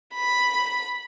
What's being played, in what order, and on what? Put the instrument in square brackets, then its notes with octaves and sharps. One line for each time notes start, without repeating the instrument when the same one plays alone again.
[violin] B5